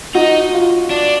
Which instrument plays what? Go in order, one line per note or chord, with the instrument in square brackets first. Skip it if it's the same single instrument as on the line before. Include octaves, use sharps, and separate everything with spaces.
[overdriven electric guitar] D#4 [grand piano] F#4
[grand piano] F4
[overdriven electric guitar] D4